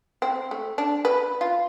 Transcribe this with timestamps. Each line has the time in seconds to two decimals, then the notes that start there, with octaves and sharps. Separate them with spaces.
0.22 C4
0.51 A3
0.78 D4
1.05 B4
1.41 F4